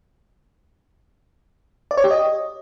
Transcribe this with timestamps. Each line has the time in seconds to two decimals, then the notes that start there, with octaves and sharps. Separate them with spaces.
1.91 D5
1.97 C#5
2.04 G4
2.11 D#5